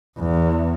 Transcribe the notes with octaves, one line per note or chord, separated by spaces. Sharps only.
E2